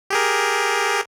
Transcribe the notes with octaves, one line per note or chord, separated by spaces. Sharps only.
G4 G#4 A#4